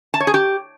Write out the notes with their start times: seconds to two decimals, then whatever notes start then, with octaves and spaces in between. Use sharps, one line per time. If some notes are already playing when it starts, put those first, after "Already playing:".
0.14 A5
0.20 C#5
0.27 G#4
0.34 G4